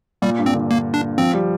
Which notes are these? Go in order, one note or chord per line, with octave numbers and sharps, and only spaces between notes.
A#2 G3
G2
C4
D3
A#3
D4
F3 C4
G3